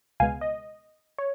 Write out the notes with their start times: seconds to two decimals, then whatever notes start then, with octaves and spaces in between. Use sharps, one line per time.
0.20 C#2 B2 G#3 B3 F5 G#5
0.41 D#5
1.18 C#5